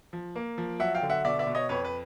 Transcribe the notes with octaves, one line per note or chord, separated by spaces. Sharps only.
F3
A#3
F3
F#3 E5 F#5
F5 G5
D3
E5 F#5
B2 D5 E5
D5 E5
B2
C#5 D#5
F2 B4 C#5
B4